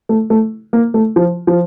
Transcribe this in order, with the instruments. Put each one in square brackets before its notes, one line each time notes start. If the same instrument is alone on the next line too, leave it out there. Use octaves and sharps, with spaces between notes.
[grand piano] A3
A3
A#3
A3
F3
F3